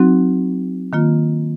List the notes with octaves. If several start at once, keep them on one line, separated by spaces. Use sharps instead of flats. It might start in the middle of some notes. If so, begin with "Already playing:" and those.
Already playing: F#3 C4 D#4 F#4
D#3 A#3 F4